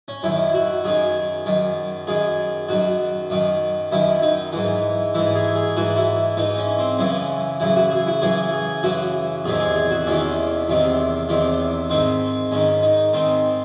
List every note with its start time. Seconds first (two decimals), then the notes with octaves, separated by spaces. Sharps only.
0.08 C#4
0.23 F#2 D#3 E4
0.54 F#4
0.85 F#2 D#3 G#4
1.46 F#2 D#3
2.07 F#2 D#3 G#4
2.69 F#2 D#3 F#4
3.30 F#2 D#3
3.92 F#2 D#3 E4
4.22 D#4
4.53 G#2 E3
5.15 G#2 E3 E4
5.35 G#4
5.55 G#4
5.76 G#2 E3 F#4
5.97 E4
6.37 G#2 E3 D#4
6.58 C#4
6.79 C4
6.99 F#2 C#3 E3 C#4
7.60 F#2 C#3 E3 E4
7.76 F#4
7.91 G#4
8.07 E4
8.22 F#2 C#3 E3 G#4
8.52 G#4
8.83 F#2 C#3 E3 F#4
9.45 E2 C3 D#3 G#4
9.60 G#4
9.76 G#4
9.91 F#4
10.06 E2 C3 D#3 C#4
10.68 E2 C3 D#3
11.29 E2 C3 D#3
11.90 G#2 D#3 C4
12.52 G#2 D#3 C#4
12.83 D#4
13.13 G#2 D#3 C4